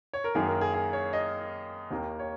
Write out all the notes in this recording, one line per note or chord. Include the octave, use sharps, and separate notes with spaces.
C#5
A#4
F#2 D#3 A#3 G#4
A#4
G#4
G#4
C#5
D#5
D#2 D#3 A#3
C#5